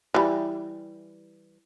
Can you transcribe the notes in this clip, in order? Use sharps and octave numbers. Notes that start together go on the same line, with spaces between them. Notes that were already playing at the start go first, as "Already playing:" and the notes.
E3 G3